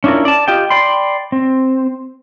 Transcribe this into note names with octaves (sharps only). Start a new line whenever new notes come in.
C#4 D4 E4 F4 A#4
D5 A5
F4 G4 D#5 G5
D5 G5 B5 C6
C4